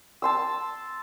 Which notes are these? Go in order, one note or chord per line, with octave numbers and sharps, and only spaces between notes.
A5 C6 E6